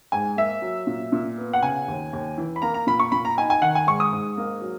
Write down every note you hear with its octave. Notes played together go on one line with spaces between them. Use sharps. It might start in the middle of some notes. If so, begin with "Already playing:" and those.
G#2 G#5
A#3 E5
F#3
A#2
A#2
B3
F#5
C#3 G#5
D#2
D#2
E3
B5
A#3 A#5
A#5
A#2 B5
C#6
A#2 B5
A#5
D#4 G#5
G#5
D#3 F#5
G#5
G#2 C#6
D#6
G#2
A#3
F#3